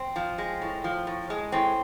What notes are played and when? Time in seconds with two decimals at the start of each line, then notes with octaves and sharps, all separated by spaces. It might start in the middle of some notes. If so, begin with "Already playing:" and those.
Already playing: C4
0.16 F3
0.38 G#3
0.61 A2
0.84 F3
1.07 A2
1.30 G#3
1.52 A2 C4